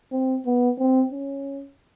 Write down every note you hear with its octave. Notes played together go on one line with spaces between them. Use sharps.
C4
B3
C4
C#4